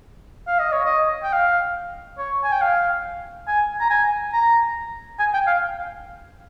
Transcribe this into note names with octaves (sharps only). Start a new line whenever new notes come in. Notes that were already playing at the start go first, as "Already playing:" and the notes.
F5
D#5
C#5
D#5
G5
F5
C#5
G#5
G5
F5
G#5
A#5
G#5
A#5
G#5
G5
F5